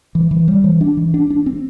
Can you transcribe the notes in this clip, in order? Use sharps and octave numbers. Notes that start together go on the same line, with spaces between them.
E3
E3
G3
E3
D4
E3
D4
D4
C4